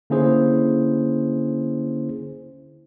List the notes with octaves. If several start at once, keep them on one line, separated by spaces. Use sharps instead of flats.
D3 A#3 C#4 E4 G#4 C5